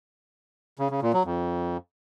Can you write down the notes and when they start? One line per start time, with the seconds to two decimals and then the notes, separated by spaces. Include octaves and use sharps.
0.79 C#3
0.90 C#3
1.02 A#2
1.13 F#3
1.25 F2